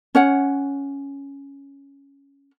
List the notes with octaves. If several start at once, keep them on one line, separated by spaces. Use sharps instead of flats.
C#4 C#5 F#5